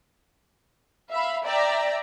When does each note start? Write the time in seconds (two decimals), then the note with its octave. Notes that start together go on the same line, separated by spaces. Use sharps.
1.11 E5 F5 B5
1.45 D5 E5 G5 A#5